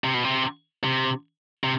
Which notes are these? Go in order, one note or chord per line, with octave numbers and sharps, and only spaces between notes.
C3
B2
C3
C3
C3